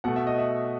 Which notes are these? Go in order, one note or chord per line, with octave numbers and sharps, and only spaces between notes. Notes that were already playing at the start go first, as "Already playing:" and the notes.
B2 A3 F#5
E5
D#5
E5